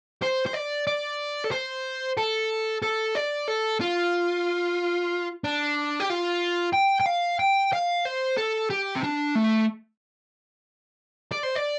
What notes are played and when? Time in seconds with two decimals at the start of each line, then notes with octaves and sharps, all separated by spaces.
0.22 C5
0.46 C5
0.53 D5
0.87 D5
1.44 A4
1.51 C5
2.17 A4
2.82 A4
3.15 D5
3.48 A4
3.81 F4
5.44 D4
6.00 G4
6.10 F4
6.74 G5
7.01 G5
7.07 F5
7.40 G5
7.73 F5
8.05 C5
8.38 A4
8.71 G4
8.96 C4
9.04 D4
9.36 A3
11.31 D5
11.43 C5
11.56 D5